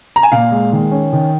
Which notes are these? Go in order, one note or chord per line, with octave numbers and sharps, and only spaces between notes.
A#5
G#5
A#2 F5
G#3
D#3
C#4
D#3